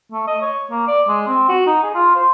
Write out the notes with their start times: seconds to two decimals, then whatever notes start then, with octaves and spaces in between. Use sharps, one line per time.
0.12 A3
0.27 D#5
0.42 C#5
0.70 A#3
0.88 D5
1.08 G#3
1.28 C4
1.49 F#4
1.66 D#4
1.83 G#4
1.95 F4
2.16 C5